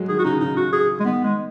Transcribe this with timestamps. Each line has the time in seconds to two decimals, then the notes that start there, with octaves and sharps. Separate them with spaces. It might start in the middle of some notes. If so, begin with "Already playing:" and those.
Already playing: F#3 G#3
0.08 D#3 G#4
0.19 F#4
0.24 C#3 D#4
0.40 C#3 D#4
0.57 F#4
0.72 G#4
1.00 G#3
1.05 D#3 B3
1.24 G#3